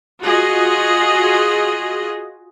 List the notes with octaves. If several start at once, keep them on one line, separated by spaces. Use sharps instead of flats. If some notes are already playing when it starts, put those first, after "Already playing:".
F4 F#4 G#4 D#5